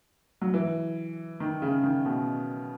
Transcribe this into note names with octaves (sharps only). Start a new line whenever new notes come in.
F#3
E3
D#3
C#3
D#3
B2